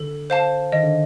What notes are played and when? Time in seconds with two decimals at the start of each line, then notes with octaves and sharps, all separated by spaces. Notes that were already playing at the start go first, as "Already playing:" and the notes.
Already playing: D3 A4
0.30 C5 F5 A5
0.72 D#3 D#5
0.83 D3